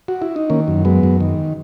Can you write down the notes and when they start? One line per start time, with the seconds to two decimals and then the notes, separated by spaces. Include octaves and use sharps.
0.08 F#4
0.22 E4
0.36 D#4
0.50 D#3 A#3 C#4
0.68 F#2
0.85 F#3 G#3 B3
1.03 F#2
1.20 D#3